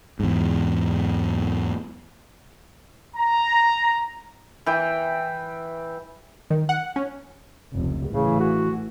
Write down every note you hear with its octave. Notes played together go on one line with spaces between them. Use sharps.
E2 G#2
A#5
E3 G5
D#3
F#5
C#4
F1 C#2
A1 A2 C#3 E3
F#4